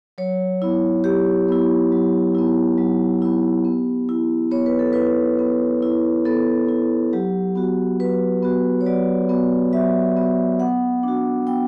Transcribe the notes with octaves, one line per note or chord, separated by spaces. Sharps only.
F#3 C#5
B3 E4
F#3 G4
B3 E4
F#3
B3 E4
F#3
B3 E4
B3
E4
B3 C#5
B4
A4
E4 B4
B3
E4
B3 A4
E4
F#3 G4
B3 F#4
F#3 B4
B3 F#4
C#5
F#3 D5
B3 F#4
F#3 E5
B3 F#4
B3 F#5
D4 F#4
B3 G5